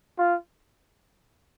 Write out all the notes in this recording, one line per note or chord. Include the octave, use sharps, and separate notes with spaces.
F4